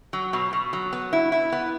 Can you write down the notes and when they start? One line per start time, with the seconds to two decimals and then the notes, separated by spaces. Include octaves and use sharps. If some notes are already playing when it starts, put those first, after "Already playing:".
0.13 F#3
0.33 B2
0.53 B2
0.73 F#3
0.93 B3
1.13 E4
1.32 E4
1.52 B3